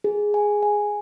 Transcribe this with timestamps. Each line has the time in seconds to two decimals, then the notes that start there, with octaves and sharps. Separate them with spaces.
0.04 G#4
0.34 G#5
0.63 G#5